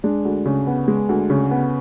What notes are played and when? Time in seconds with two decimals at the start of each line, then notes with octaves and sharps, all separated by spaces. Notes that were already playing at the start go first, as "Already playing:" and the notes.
0.04 G#3 D4
0.25 D2
0.45 C#3
0.67 B3
0.88 G#3
1.09 D2
1.30 C#3
1.51 B3